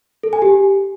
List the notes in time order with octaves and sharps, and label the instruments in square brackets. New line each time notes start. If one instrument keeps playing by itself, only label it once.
[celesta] A4
G#5
G4